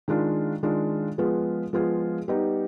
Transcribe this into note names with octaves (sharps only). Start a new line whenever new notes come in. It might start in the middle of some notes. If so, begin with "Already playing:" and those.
D#3 G#3 D4 F4
D#3 G#3 D4 F4
F3 G#3 B3 F4 G#4
F3 G#3 B3 F4 G#4
G3 B3 D#4 G4